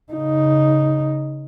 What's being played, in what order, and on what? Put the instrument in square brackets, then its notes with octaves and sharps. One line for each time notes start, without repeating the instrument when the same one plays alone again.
[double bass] C#3 D#4